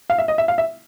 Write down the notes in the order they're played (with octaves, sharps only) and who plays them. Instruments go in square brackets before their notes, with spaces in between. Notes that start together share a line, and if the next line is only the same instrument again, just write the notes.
[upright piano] F5
E5
D#5
E5
F5
E5